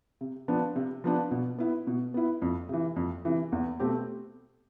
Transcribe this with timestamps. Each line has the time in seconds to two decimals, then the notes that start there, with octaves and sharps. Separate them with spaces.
0.21 C3
0.48 F3 B3 D4
0.76 C3
1.04 F3 B3 D4
1.31 B2
1.58 B3 E4
1.87 B2
2.14 B3 E4
2.42 F2
2.69 C3 E3
2.96 F2
3.25 C3 E3
3.52 E2
3.80 B2 A3 C4 G4